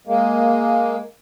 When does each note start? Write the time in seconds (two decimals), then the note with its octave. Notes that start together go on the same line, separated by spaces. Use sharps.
0.07 G#3 A#3